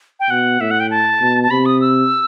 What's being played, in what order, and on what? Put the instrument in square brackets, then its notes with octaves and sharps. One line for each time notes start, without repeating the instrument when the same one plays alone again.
[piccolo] G5
[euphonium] B2 [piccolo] F#5
[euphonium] A2 [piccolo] E5
[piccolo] F#5
G5
A5
[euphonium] B2
[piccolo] A5
[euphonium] C3 [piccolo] B5
[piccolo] D#6
E6